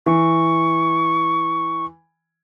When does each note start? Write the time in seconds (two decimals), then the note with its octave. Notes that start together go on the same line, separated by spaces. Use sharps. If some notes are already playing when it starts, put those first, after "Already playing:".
0.06 E3 C#6